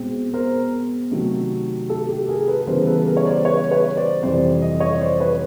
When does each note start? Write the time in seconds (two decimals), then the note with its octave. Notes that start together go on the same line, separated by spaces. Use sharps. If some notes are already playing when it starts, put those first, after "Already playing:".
Already playing: B2 G#3 C4
0.34 A#4 C5
1.11 C3 D#3 F#3 A3
1.89 G4 A4
2.09 G4 A4
2.28 G#4 A#4
2.47 A4 B4
2.67 C#3 E3 G3 B3 A#4 C5
2.87 A4 B4
3.06 G#4 A#4
3.17 C#5
3.26 C5 D5
3.45 B4 C#5
3.71 B4 C#5
3.97 C5 D5
4.23 F2 C3 E3 G3 C5 D5
4.62 D#5
4.80 C#5 D#5
5.01 C5 D5
5.20 B4 C#5